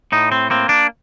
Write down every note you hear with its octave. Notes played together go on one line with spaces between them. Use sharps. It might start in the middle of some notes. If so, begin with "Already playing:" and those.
A2 D#4
C4
A#3 C4
D4